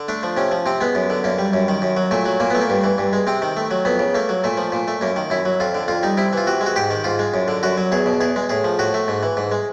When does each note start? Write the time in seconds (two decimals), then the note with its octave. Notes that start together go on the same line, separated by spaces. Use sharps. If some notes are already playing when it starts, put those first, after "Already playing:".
Already playing: D3
0.08 A3 D4
0.23 F3
0.37 C3 C#4
0.52 F3
0.66 C3 C4
0.81 G#3 B3
0.95 F#2
1.10 D3
1.24 F#2 A#3
1.38 G3
1.53 F#2
1.68 D#3
1.82 F#2
1.97 F#3
2.11 A#2 A3
2.26 F#3
2.40 A#2 A#3
2.50 A3 B3
2.61 A#3
2.70 G2
2.84 E3
2.98 G2
3.13 G#3
3.27 C3 C4
3.42 D#3
3.57 A3
3.71 F#3
3.85 F2 B3
3.99 C#3
4.15 A3 A#3
4.29 F#3
4.44 A#2 A3
4.57 F3
4.72 A#2
4.88 A3
5.01 F#2 A#3
5.16 D#3
5.30 F#2 E4
5.45 F#3
5.60 F2 F4
5.75 D3
5.88 F2 F4
6.03 G3 D#4
6.17 C3 E4
6.33 E3 F4
6.47 C3 F#4
6.61 G#3
6.66 F#4
6.76 G#2 G4
6.90 D#3
7.04 G#2 F4
7.19 G#3
7.34 F#2
7.48 D3
7.63 F#2 F#4
7.77 F#3
7.92 E2 G#4
8.06 B2
8.21 E2 G#4
8.36 G#3
8.49 A2 G#4
8.64 F3
8.79 A2 F#4
8.94 A3
9.08 G#2
9.23 E3
9.37 G#2
9.51 G#3